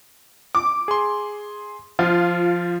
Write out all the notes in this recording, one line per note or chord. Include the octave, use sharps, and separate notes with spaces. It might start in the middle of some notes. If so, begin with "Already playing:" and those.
D6
G#4 C6
F3 F4